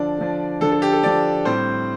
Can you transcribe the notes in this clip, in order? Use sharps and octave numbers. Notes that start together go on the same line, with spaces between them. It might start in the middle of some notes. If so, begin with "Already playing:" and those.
Already playing: D3 F3 D4 D5
D3 F3 D4
D3 F3 D4 A4
A4
G4
A4
D3 F3 D4 D5
A2 G3 C4 C5